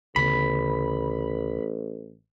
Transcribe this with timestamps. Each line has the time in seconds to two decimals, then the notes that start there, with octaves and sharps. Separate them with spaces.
0.16 A1 D2 C#3 B3 B5